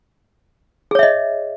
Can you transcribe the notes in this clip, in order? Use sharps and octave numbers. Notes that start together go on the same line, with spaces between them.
G#4 C#5 D#5 E5